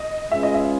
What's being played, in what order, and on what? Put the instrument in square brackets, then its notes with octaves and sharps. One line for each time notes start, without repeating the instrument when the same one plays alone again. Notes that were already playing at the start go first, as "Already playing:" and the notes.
Already playing: [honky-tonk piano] D#5
[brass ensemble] G#3 C#4 F4 G#4 B4 [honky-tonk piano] E5
[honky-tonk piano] D#5
E5